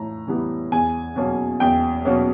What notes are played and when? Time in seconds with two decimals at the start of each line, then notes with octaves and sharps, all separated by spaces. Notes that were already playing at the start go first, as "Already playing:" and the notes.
Already playing: A2 E3 A#5
0.27 E3 G3 B3
0.72 E2 G#5
1.16 B2 F#3 A#3 C#4
1.60 E2 G5
2.05 B2 F#3 A#3 C#4